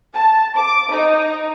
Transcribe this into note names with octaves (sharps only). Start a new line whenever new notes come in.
A5
D6
D#4